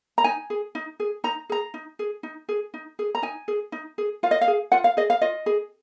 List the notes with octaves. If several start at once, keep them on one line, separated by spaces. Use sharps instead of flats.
A#5
D#4 G#5
G#4
D#4
G#4
D#4 A#5
G#4 A#5
D#4
G#4
D#4
G#4
D#4
G#4
A#5
D#4 G#5
G#4
D#4
G#4
F4 F5
D#5
F5
G#4
F4 F#5
F5
G#4 D#5
F5
F4 D#5
G#4